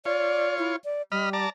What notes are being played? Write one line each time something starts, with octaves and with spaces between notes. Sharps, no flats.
F4 C#5 D5
E4
D5
G3 D#5 B5 F6
D5 A5 A#5